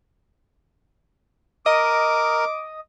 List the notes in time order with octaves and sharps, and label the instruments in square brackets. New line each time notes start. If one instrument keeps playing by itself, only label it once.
[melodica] A#4 [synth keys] D#5 D#6 [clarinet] D6